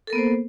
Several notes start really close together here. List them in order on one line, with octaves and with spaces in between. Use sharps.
A4 A#4 B3 A#3 C5